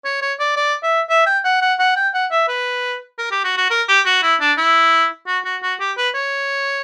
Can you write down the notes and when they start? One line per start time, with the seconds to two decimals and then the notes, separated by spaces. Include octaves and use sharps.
0.05 C#5
0.22 C#5
0.39 D5
0.57 D5
0.83 E5
1.09 E5
1.26 G5
1.45 F#5
1.62 F#5
1.79 F#5
1.96 G5
2.14 F#5
2.31 E5
2.48 B4
3.18 A#4
3.32 G4
3.44 F#4
3.57 F#4
3.70 A#4
3.89 G4
4.06 F#4
4.23 E4
4.41 D4
4.58 E4
5.27 F#4
5.45 F#4
5.62 F#4
5.80 G4
5.97 B4
6.15 C#5